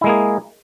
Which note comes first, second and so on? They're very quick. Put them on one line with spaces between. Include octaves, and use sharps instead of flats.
E4 G#3 A#3 G#4